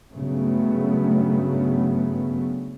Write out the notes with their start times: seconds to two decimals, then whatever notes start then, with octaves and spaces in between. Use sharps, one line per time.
0.11 G2 C#3 F#3 A3 B3